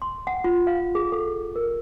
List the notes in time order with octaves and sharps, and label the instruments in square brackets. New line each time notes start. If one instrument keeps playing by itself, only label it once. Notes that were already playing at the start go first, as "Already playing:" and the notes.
[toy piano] C6
F#5
F4
F5
G#4
A4
A#4